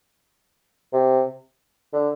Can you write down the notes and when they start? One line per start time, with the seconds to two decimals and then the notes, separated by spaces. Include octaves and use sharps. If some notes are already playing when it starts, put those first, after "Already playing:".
0.93 C3
1.93 D3